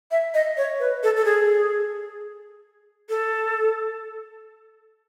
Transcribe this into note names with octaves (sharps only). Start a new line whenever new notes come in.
E5
D#5
C#5
B4
A4
A4
G#4
A4